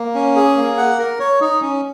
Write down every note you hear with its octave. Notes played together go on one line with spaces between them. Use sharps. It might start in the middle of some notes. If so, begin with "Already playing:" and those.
Already playing: A#3
C#4
G#4
A#3
F#5
A#4
C#5
D#4
C#4